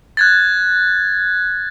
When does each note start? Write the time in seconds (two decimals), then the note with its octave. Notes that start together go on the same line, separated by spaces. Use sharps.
0.17 F#6 G#6 A6